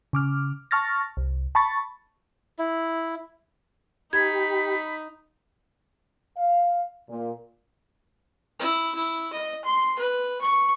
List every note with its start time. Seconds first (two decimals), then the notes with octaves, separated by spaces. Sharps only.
0.13 C#3 D6 F6
0.71 A5 C#6 F6 A6 A#6
1.17 C2
1.55 A5 B5 C#6 A6
2.59 E4
4.13 D#4 G4 B5 G#6
6.36 F5
7.09 A#2
8.60 E4
8.94 E4
9.33 D#5
9.65 C6
9.99 B4
10.41 C#6